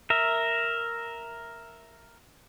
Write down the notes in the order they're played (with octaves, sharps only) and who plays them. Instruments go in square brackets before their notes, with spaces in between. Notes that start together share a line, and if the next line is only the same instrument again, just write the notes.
[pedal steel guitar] A#4 E5